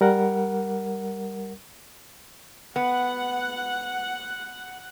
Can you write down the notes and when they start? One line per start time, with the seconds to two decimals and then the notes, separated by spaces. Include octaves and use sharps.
0.01 G3 A#4 F#5
2.76 B3 F#5